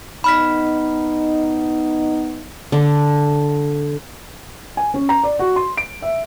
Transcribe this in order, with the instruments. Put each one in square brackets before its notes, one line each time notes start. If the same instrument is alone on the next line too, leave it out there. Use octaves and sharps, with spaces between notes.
[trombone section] B3 D#4 [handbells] B5 F6 B6
[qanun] D3
[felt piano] G#5
C#4
A#5
D5
F#4
C6
D7
E5